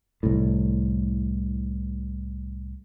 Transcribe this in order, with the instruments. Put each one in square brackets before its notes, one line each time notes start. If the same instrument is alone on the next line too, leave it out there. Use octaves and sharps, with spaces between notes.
[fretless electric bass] C2 A2